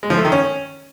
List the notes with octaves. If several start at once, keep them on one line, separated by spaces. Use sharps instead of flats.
G#3
F3
A3
D#3
C#4